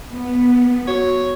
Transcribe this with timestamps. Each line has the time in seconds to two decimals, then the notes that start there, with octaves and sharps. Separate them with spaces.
0.11 B3
0.88 F#4 C#5